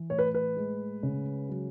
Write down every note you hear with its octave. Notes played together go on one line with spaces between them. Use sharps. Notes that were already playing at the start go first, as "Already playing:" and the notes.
Already playing: E3
A2 C#5
B4
B4
G#3
C#3
F#3